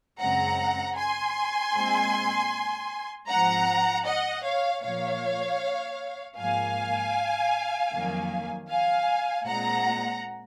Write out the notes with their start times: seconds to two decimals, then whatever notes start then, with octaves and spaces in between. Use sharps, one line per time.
0.20 F#2 C#3 G#3 C4 F#5 A#5
0.97 G#5 C6
1.74 A#2 G#3 C4
3.29 G#2 F3 C4 F#5 A#5
4.07 D#5 F#5
4.45 C#5 F5
4.83 A#2 F3 A#3 C#5 F5
6.38 G#2 F3 A#3 F5 G#5
7.92 F2 D#3 F#3 A#3
8.69 F5 G#5
9.47 A#2 G#3 C4 F#5 A#5